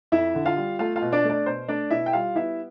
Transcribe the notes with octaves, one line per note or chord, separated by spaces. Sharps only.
F2 E4 E5
D3
F4 F5
G3
A3 F4 F5
F4 F5
B2
D4 D5
A3
D4 D5
B2 C5
A3 D4 D5
B2 E4 E5
G5
G3 F4 F5
B3 E4 E5